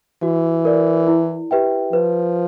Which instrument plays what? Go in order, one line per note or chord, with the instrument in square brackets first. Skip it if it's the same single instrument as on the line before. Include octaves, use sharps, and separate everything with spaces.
[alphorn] E3 [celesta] F#4
[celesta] A#4 D5
E4
G4 B4 E5 G5
[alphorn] F3 [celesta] B4